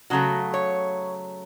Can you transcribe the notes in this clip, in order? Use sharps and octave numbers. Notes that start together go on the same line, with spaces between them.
C#3 F#3 A3 F#4
C#5